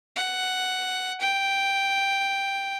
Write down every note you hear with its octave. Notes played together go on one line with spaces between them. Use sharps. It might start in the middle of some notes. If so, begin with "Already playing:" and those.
F#5
G5